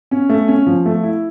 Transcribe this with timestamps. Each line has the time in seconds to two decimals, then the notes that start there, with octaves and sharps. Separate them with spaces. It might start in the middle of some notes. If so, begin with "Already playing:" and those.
0.11 C#4
0.29 A3
0.48 C#4
0.66 F3
0.86 A3
1.03 E4